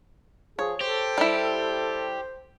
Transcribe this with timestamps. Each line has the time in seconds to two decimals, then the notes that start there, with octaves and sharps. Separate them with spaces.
0.59 F3 G#4 C#5
0.81 G4 A4 C5
1.18 G3 E4